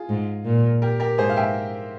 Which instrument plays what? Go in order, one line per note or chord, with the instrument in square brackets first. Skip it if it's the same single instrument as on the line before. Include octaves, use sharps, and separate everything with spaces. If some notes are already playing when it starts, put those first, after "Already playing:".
Already playing: [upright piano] F4 G#4
[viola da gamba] G#2
A#2
[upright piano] G4 A#4
G4 A#4
[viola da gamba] G#2 [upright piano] G#4 C5
[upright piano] F5
E5 G5